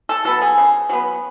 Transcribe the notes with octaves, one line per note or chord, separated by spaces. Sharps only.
A4
F#3 B3 A4
G#4
C#3
F#3 B3